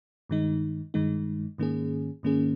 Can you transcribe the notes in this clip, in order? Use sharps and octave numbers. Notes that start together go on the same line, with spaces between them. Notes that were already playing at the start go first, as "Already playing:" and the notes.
G2 D#3 G#3 D#4
G2 D#3 G#3 D#4
G#2 D#3 A#3 C#4 G#4
G#2 D#3 A#3 C#4 G#4